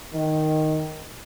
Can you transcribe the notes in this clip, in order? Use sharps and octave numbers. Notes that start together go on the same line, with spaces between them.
D#3